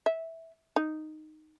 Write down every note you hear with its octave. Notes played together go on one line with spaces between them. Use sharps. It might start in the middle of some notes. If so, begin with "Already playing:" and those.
E5
D#4